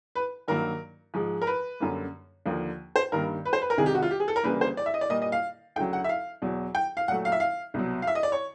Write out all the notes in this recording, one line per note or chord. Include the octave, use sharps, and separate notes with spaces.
B4
G2 D#3 F#3 A#3 A#4
G#2 F3 G#3
A#4
B4
F#2 D3 G3 A#3
D#2 D3 F3 A#3
C5
G2 D#3 G3 A#3 A#4
B4
C5
B4
A#4
C2 C3 D#3 G#3 G#4
G4
F#4
F4
G4
G#4
A4
A#4
D2 C#3 E3 G3 A#3 B4
C5
D5
E5
D#5
D5
A#2 G3 A#3 D#5
D#5
F5
D2 C#3 F#3 G5
F#5
E5
F5
E2 B2 F#3
G5
F5
A#2 F#3 A3 F#5
F5
E5
F5
C2 B2 F#3
F5
E5
D#5
D5
C#5